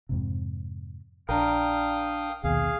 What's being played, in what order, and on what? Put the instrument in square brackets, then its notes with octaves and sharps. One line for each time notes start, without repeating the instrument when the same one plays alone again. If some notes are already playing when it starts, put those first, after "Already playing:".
[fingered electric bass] F2 G#2 C3
[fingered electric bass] A#1 [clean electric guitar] D4 A#4 [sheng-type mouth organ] F5 G5 D#6
[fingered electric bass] A#1 D#2 B2 [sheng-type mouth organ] G#4 F5